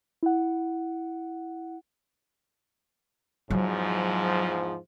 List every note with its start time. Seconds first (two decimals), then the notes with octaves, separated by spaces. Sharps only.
0.23 E4 F#5
3.50 E2 G#2 F3 F#3